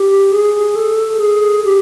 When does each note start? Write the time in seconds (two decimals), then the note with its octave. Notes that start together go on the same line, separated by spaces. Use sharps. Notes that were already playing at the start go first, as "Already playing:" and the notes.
Already playing: G4
0.31 G#4
0.75 A4
1.19 G#4
1.64 G4